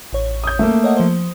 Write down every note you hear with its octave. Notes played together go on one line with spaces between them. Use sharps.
A1 C#5
D#6 G6
A3 A#3
C#5 D#5 F#5
F3 C5